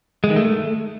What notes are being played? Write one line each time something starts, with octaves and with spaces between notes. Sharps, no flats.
G#3
D#3
A3